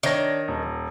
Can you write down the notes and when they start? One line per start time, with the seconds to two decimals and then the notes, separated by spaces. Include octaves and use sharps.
0.03 D#3 D4 C#5 A#6
0.48 D#1